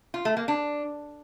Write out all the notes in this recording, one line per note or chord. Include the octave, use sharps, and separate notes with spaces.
F4
A3
A#3
D4